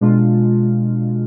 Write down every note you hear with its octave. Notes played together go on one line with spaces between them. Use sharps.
B2 G#3 D4 F4